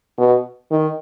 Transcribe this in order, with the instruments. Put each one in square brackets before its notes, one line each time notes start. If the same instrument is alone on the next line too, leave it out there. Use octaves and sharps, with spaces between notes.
[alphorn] B2
D#3